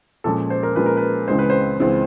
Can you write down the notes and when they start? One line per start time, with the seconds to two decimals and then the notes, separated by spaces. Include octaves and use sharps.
0.24 A#2 F3 G#3 C#4 A4
0.50 C5
0.63 A#4
0.76 A#2 F3 G#3 C#4 B4
0.86 A#4
0.97 B4
1.28 C#2 C#3 E3 G#3 C4 C5
1.39 B4
1.50 C5
1.80 C#2 C#3 E3 G#3 C4